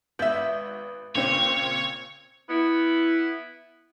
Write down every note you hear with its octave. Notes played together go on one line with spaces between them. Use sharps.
G#1 B3 B4 E5 G6
A#2 C#3 C4 C#5
B3 E4